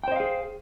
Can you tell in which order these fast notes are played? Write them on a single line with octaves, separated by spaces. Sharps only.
G5 C5 D#5 F5 G#4